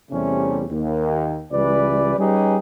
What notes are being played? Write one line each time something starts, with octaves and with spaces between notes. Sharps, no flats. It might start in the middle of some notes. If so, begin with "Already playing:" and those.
E2 C3 G3 A3 C#4
D#2
C#2 E3 G3 B4 D5
G3 C#4 D#4 G4 G#4 B4